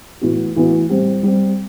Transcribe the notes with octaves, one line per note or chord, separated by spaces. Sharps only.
A2 E3 B3 F#4
A2 E3 B3 F#4
G3 C4 G4
G3 C4 G4